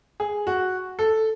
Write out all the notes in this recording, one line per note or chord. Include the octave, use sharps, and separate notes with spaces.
G#4
F#4
A4